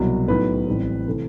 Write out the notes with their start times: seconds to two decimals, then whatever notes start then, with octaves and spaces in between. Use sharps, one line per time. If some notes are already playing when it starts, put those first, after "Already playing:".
Already playing: C2 B2 F#3
0.28 B1 A2 F#3 B3 B4
0.67 A1 A2 G3 C4
1.07 C3 E3 A3 C4